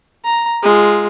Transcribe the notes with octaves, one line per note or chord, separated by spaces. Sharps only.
A#5
G#3 F4